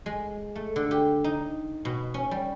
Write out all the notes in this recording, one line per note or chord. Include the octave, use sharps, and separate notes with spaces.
G#3
A3
D3
G4
D#4
B2
C#4
G3